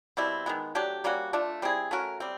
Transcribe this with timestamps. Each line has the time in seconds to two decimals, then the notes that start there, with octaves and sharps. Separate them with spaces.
0.17 B2 G3 C4 E4
0.46 D#3 G#3 B3
0.75 F#3 A3 D4 G4
1.04 G3 A#3 C#4 F#4
1.33 A3 D4 F4
1.62 G3 C4 E4 G#4
1.91 A3 C#4 F#4 A#4
2.20 G3 C4